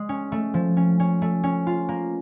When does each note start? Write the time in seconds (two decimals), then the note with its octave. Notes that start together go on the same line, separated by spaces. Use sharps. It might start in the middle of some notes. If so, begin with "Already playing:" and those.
Already playing: G#3
0.09 C#4
0.32 A3
0.54 F3
0.77 C#4
1.00 C#4
1.22 A3
1.44 C#4
1.67 F4
1.89 A#3